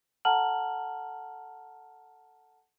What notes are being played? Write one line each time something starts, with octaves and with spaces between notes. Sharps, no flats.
A4 F#5 A5 A#5 F6 F#7